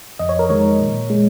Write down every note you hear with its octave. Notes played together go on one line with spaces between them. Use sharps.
F2 D#5
C#5
A#4
D#3 G#3 C#5
A#2
G#3